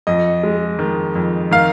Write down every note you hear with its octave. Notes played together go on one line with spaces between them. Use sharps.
F2 D#5
G#3
D#3
F2
D#3 F5